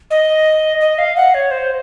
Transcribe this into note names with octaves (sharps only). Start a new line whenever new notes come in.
D#5
D#5
F5
F#5
C#5
C5